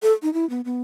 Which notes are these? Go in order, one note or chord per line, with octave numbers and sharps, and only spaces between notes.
A4
D#4
E4
B3
B3